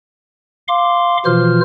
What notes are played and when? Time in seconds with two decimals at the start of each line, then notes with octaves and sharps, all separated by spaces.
0.68 F5 C6 D6
1.25 B2 E3 F3 F4 C5 F6